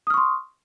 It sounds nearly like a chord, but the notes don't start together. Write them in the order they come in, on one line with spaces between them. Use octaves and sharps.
D#6 F6 C#6 C6